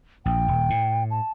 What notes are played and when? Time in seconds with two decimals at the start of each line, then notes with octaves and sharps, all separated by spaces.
0.26 A#1 G5
0.48 D#1
0.70 A2
1.11 A5